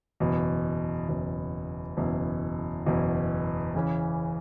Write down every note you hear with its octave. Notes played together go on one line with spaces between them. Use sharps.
F#1 E2 B2
F#1 E2 B2
F#1 E2 B2
F#1 E2 B2
E2 C#3 E3 C#4